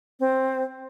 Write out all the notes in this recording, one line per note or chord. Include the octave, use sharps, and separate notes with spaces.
C4